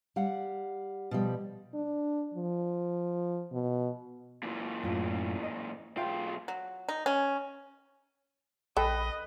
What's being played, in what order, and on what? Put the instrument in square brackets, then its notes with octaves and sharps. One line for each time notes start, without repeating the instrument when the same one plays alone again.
[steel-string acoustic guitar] G3 F5 F#5
B2 F3 G3
[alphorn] D4
F3
B2
[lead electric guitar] A#2 E3
[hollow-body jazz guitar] F#2 A2 F4
D#5
[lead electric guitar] B1 F4 [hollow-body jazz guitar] E5 G5
[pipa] F#3
D#4
C#4
[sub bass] A#1 [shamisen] A4 G5 [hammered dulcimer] B4 [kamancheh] D#5